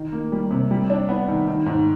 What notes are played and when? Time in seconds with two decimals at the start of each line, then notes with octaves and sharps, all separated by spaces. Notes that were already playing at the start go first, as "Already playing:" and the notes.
Already playing: D#3
0.12 A#3
0.32 G3
0.51 C3
0.71 G3
0.90 D4
1.09 B3
1.28 D#3
1.47 D#3
1.66 G#2